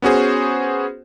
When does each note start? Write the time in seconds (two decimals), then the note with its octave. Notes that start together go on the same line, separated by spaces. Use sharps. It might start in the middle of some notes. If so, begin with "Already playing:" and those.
0.02 B3 C#4 F#4 G#4 C5